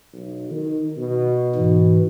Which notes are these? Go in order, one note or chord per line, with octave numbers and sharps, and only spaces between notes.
B1
D#3
B2
G#2 E3